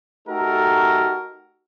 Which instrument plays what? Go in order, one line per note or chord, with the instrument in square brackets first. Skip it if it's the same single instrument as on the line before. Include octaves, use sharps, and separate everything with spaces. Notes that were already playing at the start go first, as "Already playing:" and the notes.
[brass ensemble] A3 D#4 F#4 G4 A4 A#4